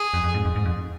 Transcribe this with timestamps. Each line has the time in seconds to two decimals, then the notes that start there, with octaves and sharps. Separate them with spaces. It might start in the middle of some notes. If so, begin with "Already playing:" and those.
Already playing: G#4
0.14 F2
0.24 F2
0.34 G#2
0.45 F2
0.56 G#2
0.65 F2